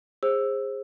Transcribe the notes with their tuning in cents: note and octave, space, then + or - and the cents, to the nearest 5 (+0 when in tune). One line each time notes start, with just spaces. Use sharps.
G#4 -20 C5 +25 E6 +0